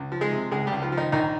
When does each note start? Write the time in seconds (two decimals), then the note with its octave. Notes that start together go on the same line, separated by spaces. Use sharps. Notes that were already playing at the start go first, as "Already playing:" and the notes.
Already playing: C#2
0.12 F3
0.21 G#3 G#4
0.31 C3
0.51 C#2 G#3 G#4
0.67 G3 G4
0.72 C#2
0.82 F3 F4
0.92 F3
0.97 D#3 D#4
1.12 A#1 D#3 D#4